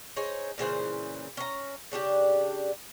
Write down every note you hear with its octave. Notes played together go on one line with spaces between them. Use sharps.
D#4 G#4 C5 C#5
A#2 C#3 E3 C5
C#4 F5 A#5
C#3 D4 F#4 G4